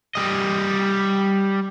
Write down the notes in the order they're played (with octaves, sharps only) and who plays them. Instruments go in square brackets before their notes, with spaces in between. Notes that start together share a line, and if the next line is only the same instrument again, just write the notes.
[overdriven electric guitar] G3 D#5